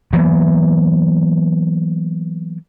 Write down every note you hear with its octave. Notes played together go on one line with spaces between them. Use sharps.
E3 F#3 A#3 B3